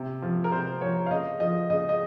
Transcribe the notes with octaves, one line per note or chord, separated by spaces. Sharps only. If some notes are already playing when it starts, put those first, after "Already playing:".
Already playing: C3
F3
A#4
C3 C5
F3 C#5
F5
C#3 D#5
F3 D#5
C#3 D#5
D#5